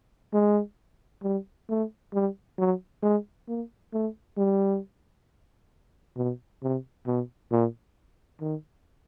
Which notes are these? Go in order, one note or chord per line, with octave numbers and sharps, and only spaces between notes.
G#3
G3
A3
G3
F#3
G#3
A#3
A3
G3
B2
C3
B2
A#2
D#3